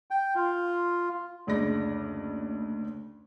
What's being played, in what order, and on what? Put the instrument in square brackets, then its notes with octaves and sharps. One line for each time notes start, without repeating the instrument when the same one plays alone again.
[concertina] G5
F4
[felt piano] F#1 D2 G#3 D5 A#6